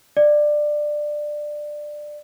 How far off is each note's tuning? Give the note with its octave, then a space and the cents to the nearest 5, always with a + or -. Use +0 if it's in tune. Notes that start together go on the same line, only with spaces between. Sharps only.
D5 +15